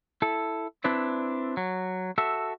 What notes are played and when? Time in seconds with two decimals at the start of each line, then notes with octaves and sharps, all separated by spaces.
0.22 E4 A4
0.84 C4 D4 E4 B4 D5
1.57 F#3
2.18 F#4 A4 E5